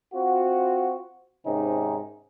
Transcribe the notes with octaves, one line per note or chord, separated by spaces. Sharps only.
C4 F4 F#4
G#2 C3 D#3 C#4 D#4